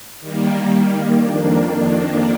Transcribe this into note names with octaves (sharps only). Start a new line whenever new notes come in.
D#3 G3 A#3
F2 D#3 A#3 D4